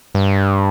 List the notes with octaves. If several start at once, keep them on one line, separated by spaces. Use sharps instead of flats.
G2